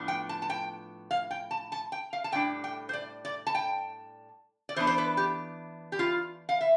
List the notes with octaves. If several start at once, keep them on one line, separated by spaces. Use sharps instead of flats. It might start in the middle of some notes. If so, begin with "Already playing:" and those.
Already playing: A2 F3 B3 D4
G5
A5
A5
G5
F5
G5
A5
A5
G5
F5
A5
A2 G3 D4 G5
G5
C5
D5
D5
A5
G5
D5
E3 B3 D4 C5
C5
B4
G4
G4
F4
F5
E5